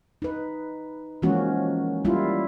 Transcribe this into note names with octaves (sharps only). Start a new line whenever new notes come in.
D#4 B4
E3 F3 G#3 A#3 C#4 F#4
G3 A#3 E4 F4